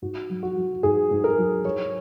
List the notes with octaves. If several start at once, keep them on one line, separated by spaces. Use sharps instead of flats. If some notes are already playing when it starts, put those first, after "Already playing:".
G#2 F#4
F#3
F#4
F#3
G#2 G#4
G#2
A#4
F#3
F#3 C#5